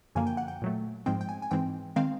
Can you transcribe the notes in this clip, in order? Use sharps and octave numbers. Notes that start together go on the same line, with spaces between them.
F#2 D3 F3 A#3 G#5
G5
F#5
G5
A#2 F#3 A3
G#2 F3 G#3 C4 G5
G5
G#5
G#5
G#2 E3 G#3 C4 G5
D#3 G#3 C4 F5